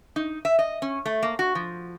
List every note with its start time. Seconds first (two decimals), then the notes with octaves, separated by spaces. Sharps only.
0.16 D#4
0.45 E5
0.59 D#5
0.82 C#4
1.06 A3
1.23 A#3
1.39 F#4
1.55 F3